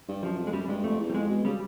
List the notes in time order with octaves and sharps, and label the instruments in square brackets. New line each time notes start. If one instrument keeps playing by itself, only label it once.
[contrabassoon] G2
[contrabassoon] F#2 [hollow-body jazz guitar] F3
[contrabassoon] F2
[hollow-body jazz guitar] G#3
[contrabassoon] F#2 [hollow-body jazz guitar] G3
[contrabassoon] G2 [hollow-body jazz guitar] G#3
[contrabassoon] F2 [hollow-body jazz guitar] A3
[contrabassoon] E2
[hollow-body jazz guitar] G3
[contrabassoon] F2 [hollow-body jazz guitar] G#3
[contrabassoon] B2
[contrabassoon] C#3 [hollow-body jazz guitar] G3